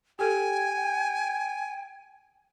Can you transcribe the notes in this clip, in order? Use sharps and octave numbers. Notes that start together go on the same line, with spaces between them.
G4 A4 G5 G#5